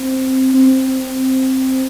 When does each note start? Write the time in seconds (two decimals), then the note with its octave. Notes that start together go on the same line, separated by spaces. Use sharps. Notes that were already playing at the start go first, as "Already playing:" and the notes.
Already playing: C4
0.54 C4